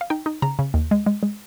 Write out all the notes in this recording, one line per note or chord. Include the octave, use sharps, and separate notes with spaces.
F5
D#4 G5
D#4
C#3 A#5
C#3
D#2
G#3
G#3
G#3